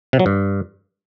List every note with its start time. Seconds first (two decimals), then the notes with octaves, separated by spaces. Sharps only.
0.13 C3
0.19 F#3
0.26 G2